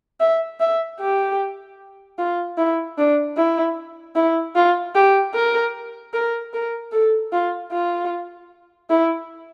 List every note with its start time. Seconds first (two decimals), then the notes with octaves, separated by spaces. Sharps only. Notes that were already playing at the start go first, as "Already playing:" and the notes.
0.20 E5
0.60 E5
0.99 G4
2.18 F4
2.57 E4
2.97 D4
3.37 E4
4.15 E4
4.55 F4
4.95 G4
5.34 A#4
6.13 A#4
6.53 A#4
6.92 A4
7.32 F4
7.71 F4
8.90 E4